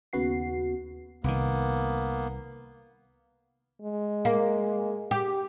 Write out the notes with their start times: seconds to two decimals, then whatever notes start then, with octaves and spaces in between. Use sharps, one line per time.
0.13 D#2 C#3 B3 F#4 C7
1.24 C2 D#3 A#3 B3
3.82 G#3
4.25 A#3
5.11 G4